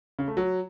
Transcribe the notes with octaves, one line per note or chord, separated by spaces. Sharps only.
C#3
A3
F#3